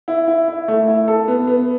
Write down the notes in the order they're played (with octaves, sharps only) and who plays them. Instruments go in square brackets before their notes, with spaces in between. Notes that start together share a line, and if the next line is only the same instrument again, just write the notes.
[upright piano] E4
E4
E4
A3
E4
A4
B3
B3